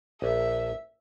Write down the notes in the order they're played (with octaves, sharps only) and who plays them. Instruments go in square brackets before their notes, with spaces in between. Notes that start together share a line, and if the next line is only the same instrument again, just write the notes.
[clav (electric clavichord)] A#1 [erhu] E5